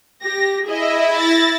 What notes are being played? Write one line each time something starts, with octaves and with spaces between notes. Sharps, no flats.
G4 A#6
E4 G#4 D#5 E5
A6 A#6